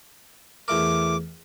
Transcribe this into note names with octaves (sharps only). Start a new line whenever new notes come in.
E2 A3 A#4 D6